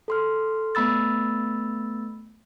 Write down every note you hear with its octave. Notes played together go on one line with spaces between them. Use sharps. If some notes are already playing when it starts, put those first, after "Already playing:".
A4 C6 F6
A3 B3 B5 E6 A6